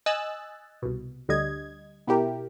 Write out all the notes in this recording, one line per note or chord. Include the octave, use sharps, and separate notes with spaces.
D#5 G#5 E6 F#6 A6
C2 B2
D2 D3 G3 D#5 G#6
B2 E4 G4 A#4